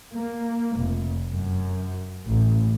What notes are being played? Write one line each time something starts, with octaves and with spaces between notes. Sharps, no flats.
A#3
F1
F#2
A1